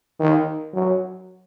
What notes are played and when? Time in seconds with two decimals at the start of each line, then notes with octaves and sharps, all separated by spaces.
0.20 D#3
0.74 F#3